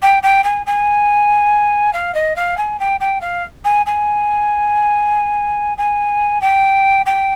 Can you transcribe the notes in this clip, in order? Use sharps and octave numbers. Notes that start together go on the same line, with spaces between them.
G5
G5
G#5
G#5
F5
D#5
F5
G#5
G5
G5
F5
G#5
G#5
G#5
G5
G5